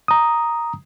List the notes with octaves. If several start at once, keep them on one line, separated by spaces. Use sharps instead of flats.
A#5 D#6